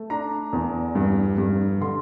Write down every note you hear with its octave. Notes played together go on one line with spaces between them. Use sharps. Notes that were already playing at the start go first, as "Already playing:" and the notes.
Already playing: A3
D4 A#5
E2
G2
G2
D3 C6